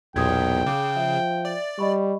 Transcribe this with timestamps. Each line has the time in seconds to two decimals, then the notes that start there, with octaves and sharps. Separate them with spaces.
0.16 B1 E2 A#2 G5 D#6 G#6
0.66 C#3 D6
0.96 F3 E5
1.45 D5
1.79 G3 D#5 B5 C#6